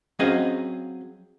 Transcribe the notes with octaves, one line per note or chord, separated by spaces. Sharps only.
F#3 C4 C#4 G#4 D#5 F5